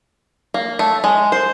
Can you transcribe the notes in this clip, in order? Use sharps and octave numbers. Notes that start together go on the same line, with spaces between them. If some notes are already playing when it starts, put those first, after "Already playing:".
A#3
A3
G#3
C5